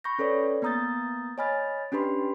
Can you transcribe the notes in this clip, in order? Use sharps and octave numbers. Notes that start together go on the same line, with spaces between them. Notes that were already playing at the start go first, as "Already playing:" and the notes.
B5 C#6 G6 A#6
C#4 A4 B4 C#5 D5
A#3 B3 A#5 D#6 G6 A6
C#5 D#5 G#5 B5 F6 A6
C#4 D4 G4 B4 B5 C6